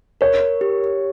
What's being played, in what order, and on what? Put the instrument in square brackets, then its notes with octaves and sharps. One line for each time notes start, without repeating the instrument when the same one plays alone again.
[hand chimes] A#4 [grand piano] C#5
[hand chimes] G4